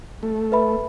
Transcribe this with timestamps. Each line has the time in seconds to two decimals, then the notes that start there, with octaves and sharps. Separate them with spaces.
0.23 A3
0.52 B4 E5 B5